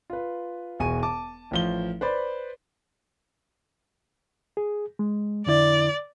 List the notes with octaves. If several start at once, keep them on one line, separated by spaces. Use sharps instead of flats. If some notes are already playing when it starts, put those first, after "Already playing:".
F4 B4
E1 B2 G#5 C#6 D#7
A5 D6
A1 F3 G7
B4 C5 D5 B5
G#4
G#3
F2 D3 E4 D5